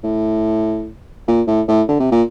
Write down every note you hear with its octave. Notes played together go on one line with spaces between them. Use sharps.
A2
A#2
A2
A2
D3
C3
A#2